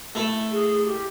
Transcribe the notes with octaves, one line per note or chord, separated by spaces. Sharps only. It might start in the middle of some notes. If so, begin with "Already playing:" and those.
A3 E4
G#4
G4